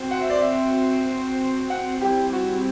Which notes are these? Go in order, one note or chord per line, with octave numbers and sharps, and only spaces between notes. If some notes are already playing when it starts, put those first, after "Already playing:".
Already playing: C4 F#4 C5
F#5
E5
D5
E5
F#5
G3 C4 E4 G4
F#4